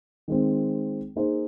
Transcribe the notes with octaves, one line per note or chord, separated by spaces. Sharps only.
D#3 G#3 C4
A#3 D#4 G#4 C5